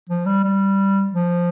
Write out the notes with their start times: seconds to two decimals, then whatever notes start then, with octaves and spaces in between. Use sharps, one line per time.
0.09 F3
0.26 G3
0.44 G3
1.13 F3